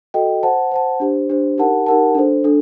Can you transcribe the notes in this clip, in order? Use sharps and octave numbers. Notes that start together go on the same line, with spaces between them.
F#4 A4 D#5 G5
C5 F#5 A5
C5 F#5 A5
D4 G4 C5
D4 G4 C5
D#4 G4 A#4 F#5 A5
D#4 G4 A#4 F#5 A5
D4 A4 C5
D4 A4